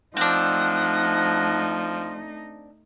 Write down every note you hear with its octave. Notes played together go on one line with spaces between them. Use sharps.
F3 A3 C4 D4 D#4 F#5